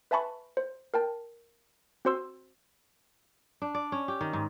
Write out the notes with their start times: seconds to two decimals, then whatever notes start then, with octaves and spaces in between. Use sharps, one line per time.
0.11 B4 E5 G#5 A5 B5 C#6
0.57 C5
0.94 A#4 G5 A5
2.05 C4 F#4 C5 C6 E6
3.62 D4
3.75 D5
3.92 C#4
4.08 G4
4.21 D#3
4.33 G#2